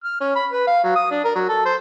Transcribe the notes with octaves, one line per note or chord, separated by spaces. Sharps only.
F6
C#4
B5
B4
F5
F#3
D#6
D4
A#4
F#3
A4
C5